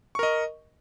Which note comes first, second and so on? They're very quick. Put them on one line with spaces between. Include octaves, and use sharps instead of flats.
C#6 A#4 D#5